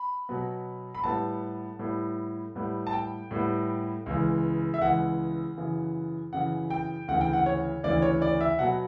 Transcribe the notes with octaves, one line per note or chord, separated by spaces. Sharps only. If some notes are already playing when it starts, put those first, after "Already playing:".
Already playing: B5
B2 F#3 B3
B5
A2 G3 B3 A5
A2 G3 B3
A2 G3 B3
A5
G5
A2 G3 B3
C#2 C#3 E3
E5
C#2 C#3 E3 F#5
F#2 C#3 E3
F#2 C#3 E3 F#5
G5
D2 C#3 E3 F#5
G5
F#5
C#5
D2 C#3 E3 D5
C#5
D5
E5
B2 F#3 B3 F#5